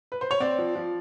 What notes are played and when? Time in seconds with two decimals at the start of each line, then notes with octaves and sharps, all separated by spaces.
0.12 B4
0.21 C5
0.31 C#5
0.40 C4 D5
0.58 F3
0.75 F3